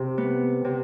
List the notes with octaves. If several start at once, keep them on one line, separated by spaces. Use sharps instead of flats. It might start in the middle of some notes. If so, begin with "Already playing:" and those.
Already playing: C3
B3
C3